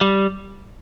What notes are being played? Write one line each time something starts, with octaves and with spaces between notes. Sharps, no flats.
G3